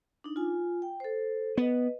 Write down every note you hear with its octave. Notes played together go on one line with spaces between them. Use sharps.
D4 D#4
F4 G#5
G5
A4 C5
B3 B4 D#5